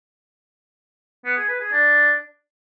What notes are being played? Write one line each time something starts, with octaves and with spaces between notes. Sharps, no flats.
B3
G#4
B4
G#4
D4